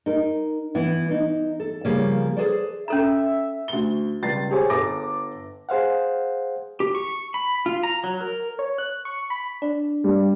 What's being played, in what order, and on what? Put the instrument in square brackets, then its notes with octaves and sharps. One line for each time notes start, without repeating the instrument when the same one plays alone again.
[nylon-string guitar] D#4 A#4
E3 B3 E4
D#4 E4
A4
C#3 F3 G3 A#3 B3
G#4 A4 B4 C5 D5
[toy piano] C#4 A4 A#5 [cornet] E5
[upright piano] D2 G7
C#2 G3 A6 C7
G4 G#4 C5 C#5 G#5
G1 A4 D6 A#6
[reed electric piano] G#4 C5 F5 F#5
[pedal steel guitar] G4
C#6
B5
F4
A#5
F#3
A#4
[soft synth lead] C#5
F#6
C#6
B5
D4
[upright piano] G3